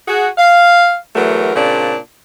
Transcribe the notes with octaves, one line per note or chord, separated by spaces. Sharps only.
F#4 G#4
F5
E2 F#3 A3 A#4
A#2 C#3 C4 D4